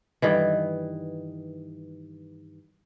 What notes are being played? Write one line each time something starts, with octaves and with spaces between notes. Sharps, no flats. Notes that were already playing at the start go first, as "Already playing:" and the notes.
G2 D#3 E3